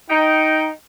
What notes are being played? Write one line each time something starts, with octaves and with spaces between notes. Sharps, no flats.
D#4 G5